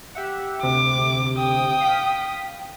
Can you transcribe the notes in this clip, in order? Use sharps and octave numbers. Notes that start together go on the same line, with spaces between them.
G4 E5 F#5
D2 C3 D6
G5 D#6
F5 B6